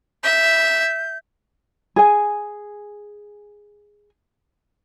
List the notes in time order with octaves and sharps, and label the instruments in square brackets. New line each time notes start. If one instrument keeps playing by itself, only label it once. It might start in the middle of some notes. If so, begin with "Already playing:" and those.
[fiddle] E5 [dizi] G6
[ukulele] G#4 G#5